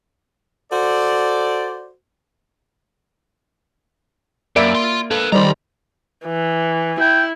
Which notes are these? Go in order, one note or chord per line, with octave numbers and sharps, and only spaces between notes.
F#4 A4 C5 D5
F#2 A#3 D5 E5 B5 D7
F4 C6
A4 B4 F5
D#3 G3 C5 D5 D#5 A#5 B5
E3
E4 G5